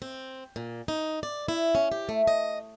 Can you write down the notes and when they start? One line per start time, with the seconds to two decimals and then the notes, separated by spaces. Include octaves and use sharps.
0.02 C4
0.56 A#2
0.88 D#4
1.23 D5
1.48 E4
1.75 C#4
1.92 G4
2.09 A3
2.27 D#5